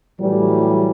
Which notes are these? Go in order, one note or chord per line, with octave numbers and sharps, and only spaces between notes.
A2 E3 F#3 G3